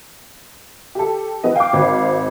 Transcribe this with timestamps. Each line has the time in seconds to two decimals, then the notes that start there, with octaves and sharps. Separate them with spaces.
0.95 G4 A4
1.44 E3 B3 D#5
1.56 F5 G5 D6
1.73 G#1 C5